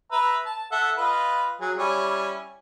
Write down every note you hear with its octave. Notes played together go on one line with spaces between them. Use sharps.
B4 E5 A#5
A5
A4 E5 F#5
F4 B4 D#5
F#3 G#4
G3 C#4 E4